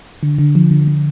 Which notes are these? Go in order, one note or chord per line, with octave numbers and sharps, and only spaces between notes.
D3
D3
F3
D3
D3